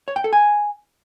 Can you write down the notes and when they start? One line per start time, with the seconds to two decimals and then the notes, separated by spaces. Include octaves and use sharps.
0.08 C#5
0.16 G5
0.24 A4
0.33 G#5